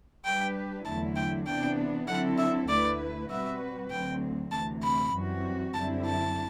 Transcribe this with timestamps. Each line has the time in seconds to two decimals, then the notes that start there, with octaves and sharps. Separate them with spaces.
0.24 G3 D4 G4 B4 G5
0.85 E2 D3 F#3 A3 E4 A5
1.16 G5
1.47 C3 E3 B3 D4 G5
2.08 D3 F#3 C4 E4 A4 F#5
2.38 E5
2.68 D2 D3 A3 E4 B4 D5
3.29 B2 G3 C4 F#4 B4 E5
3.91 D2 D3 F#3 C4 G5
4.52 D2 C3 E3 A5
4.83 B5
5.14 F#2 E3 G3 C4 F#4
5.74 F#2 D3 G3 C4 E4 A5
6.05 A5